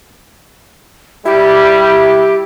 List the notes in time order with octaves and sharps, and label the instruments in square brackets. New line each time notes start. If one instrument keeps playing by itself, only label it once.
[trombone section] G3 [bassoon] E4 [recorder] G4